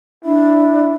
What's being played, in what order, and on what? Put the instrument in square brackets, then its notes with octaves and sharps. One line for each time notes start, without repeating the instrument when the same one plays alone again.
[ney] D4 [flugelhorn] E4